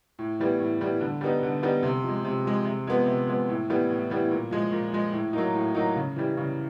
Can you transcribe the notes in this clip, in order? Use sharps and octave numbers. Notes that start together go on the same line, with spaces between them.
A2
E3 G3 B3
A2
E3 G3 B3
D3
G3 B3 D#4
D3
G3 B3 D#4
C3
F3 G#3
C3
F3 G#3
C3
F3 G#3 B3
C3
F3 G#3 B3
A2
E3 G3 B3
A2
E3 G3 B3
A#2
F3 G#3
A#2
F3 G#3
A2
F#3 A#3 D#4
A2
F#3 A#3 D#4
C#3
E3 G3
C#3